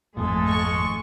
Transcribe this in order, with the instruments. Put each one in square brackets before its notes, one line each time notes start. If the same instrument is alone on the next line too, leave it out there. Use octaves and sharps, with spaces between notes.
[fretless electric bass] G#1 F2 A#2 [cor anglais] G#3 [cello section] A3 A4
[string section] C#6